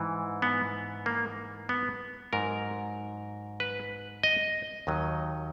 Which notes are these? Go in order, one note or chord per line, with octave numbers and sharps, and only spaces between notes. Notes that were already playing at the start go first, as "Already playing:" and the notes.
Already playing: G#2 E3
B3
A#3
B3
G#2 F#3 A#4
B4
D#5
D#2 D#3 F#3